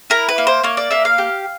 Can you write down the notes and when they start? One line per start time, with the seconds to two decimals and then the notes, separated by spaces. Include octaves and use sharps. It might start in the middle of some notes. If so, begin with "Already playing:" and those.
0.10 E4 A#4
0.29 B4
0.38 A#3
0.47 C5
0.63 A#3 C#5
0.77 D5
0.91 A#3 E5
1.05 F5
1.18 G4